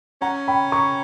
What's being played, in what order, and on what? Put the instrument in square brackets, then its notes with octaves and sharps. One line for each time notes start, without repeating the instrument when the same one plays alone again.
[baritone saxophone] C#4 [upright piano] F#5 A#5
[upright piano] G5 B5
A#5 C#6